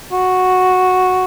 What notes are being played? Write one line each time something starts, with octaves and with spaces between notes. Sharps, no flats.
F#4